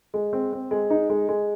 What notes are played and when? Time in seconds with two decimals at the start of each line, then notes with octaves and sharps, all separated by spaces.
0.14 G#3
0.33 C4
0.53 C4
0.71 G#3
0.90 D#4
1.10 G#3
1.29 G#3